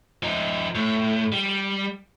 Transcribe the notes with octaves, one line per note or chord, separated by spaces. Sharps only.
F3 D#4
A2
G3